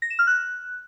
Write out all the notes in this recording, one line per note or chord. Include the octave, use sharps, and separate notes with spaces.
A#6
E7
F6
F#6